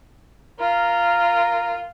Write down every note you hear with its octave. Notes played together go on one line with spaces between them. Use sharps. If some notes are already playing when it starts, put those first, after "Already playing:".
F4 A#4